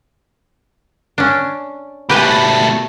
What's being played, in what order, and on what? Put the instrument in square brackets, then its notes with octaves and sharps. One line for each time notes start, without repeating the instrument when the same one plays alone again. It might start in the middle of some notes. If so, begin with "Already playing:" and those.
[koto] C#4 D4
[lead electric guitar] B2 A3 [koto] G4 B4 G#5